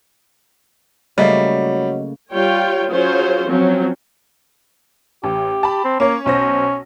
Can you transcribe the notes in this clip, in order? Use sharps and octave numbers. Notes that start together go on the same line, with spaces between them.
C#3 F#3 G3 A3 A#3 D#5
G3 F4 C#5 G5
F#3 C#4 F4 G#4 C5 C#5
F3 F#3 C4 C#4
A1 G4
A5 B5
C4
A#3 C#4 C#5
B1 C#4 C5 A#6